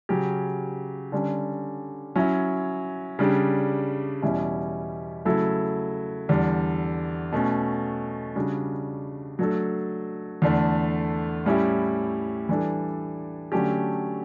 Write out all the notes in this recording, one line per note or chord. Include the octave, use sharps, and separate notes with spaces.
C#3 F#3 C#4 G4
D3 G3 C#4
F#3 C#4 E4
C#3 G3 D4 G4
E2 B2 G3 C#4 E4
C#3 F#3 A3 E4 A4
E2 D3 G3
B2 A3 C#4
C#3 G3 D4 F#4
F#3 A3 D4 A4
E2 D3 A3
A2 G3 C#4 E4 G4
E3 G3 D4 A4
D3 F#3 A3 C#4 G4